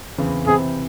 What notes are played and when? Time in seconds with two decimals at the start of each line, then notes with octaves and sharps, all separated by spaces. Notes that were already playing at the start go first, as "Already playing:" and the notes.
0.18 E2 C#3 E3 C4
0.46 C3 E3 C4 E4 G#4 C5